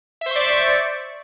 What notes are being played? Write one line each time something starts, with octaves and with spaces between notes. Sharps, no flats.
C5 D5 E5 C#6